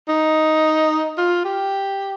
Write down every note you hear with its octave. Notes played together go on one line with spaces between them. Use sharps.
D#4
F4
G4